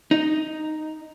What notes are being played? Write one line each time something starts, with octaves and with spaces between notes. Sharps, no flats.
D#4